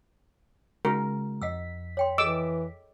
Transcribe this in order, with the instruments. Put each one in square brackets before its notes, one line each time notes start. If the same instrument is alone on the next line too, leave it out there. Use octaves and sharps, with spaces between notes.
[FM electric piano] C#3 G#3 [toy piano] D#4 F#4 F#5 [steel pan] A#4
[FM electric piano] F2 B6 [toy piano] D#5 F#5 E6
[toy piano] C#5 G5 C6
[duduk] E3 [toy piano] G#4 A4 D#5 [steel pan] D6 E6